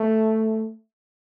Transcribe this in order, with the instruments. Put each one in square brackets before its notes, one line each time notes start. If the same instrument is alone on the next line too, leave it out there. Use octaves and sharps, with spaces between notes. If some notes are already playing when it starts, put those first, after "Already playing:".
Already playing: [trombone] A3